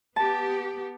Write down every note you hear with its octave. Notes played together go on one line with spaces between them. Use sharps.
B3 G4 A5